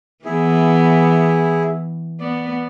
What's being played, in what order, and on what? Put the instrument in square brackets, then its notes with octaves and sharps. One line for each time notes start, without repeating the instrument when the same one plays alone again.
[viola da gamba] E3 B3 [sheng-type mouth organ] E4 G#4
[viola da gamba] B3 [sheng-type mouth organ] D5